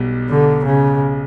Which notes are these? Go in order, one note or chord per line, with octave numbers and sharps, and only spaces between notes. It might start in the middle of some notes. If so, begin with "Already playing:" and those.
Already playing: B1 B2 G3
D3
C#3